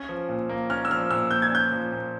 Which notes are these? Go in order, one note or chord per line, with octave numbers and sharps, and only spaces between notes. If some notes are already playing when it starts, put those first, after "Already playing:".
Already playing: C#4
F3
A#2
A#3
C#4 F6
E6
F3 F6
A#2 E6
A#3 G6
G#6
C#4 G6
F3
A#2